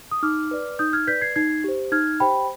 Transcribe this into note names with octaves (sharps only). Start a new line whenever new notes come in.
D#6
D#4 D6 F6
B4 D5
D#4 D#6 G6
F6 G#6
B4 D5 G6 B6
G#6 C7
D#4 G#6 C7
G4 C5
D#4 F6 G#6
G4 C5 G5 B5